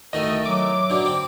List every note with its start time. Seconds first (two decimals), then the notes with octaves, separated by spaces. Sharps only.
0.13 C2 D#3 A3 F#4 A4 D#5
0.45 F#3 D6
0.90 B2 D3
1.05 C4